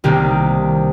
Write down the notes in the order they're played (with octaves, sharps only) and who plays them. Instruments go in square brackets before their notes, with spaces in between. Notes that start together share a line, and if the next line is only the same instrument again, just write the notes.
[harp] C2 C3 D#3 A#3 G4